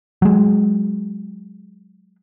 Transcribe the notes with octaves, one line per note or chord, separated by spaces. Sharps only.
F#3 G#3